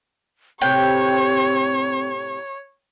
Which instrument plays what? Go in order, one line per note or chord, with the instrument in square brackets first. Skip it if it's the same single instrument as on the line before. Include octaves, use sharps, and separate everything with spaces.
[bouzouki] A2 C3 G4 [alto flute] C4 [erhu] C#5 [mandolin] G5